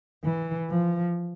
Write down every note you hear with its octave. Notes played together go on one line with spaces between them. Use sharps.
E3
F3